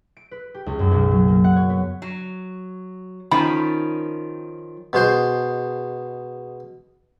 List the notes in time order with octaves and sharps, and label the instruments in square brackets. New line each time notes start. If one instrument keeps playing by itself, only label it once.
[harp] D7
B4
G4
C#2
F#2
B1
F#3
A#3
F#5
C#5
B3
[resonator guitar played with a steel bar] F#3
[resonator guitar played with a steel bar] D#3 F3 C#4 [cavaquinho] B5
[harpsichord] B2 G#3 C5 C6